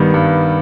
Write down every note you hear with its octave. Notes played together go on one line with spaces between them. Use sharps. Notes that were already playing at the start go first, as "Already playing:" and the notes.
Already playing: G2 D#3 G3 B3
G2